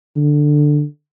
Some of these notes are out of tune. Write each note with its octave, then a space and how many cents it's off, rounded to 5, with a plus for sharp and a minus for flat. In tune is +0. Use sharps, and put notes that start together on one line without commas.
D3 +10